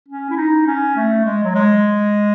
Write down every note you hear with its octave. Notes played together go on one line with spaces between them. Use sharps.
C#4
E4
D#4
C#4
A3
G#3
F#3
G#3